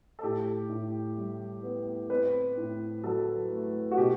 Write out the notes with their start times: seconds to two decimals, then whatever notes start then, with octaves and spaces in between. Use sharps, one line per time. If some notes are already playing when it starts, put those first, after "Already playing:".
0.19 A4
0.23 A2 G4
0.69 A2
1.17 G3
1.63 B3
2.10 C4 B4
2.57 A2
3.03 F#3 A4
3.51 A3
3.92 F#4
3.97 B2 G4